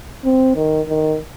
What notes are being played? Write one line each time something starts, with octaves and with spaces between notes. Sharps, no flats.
C4
D#3
D#3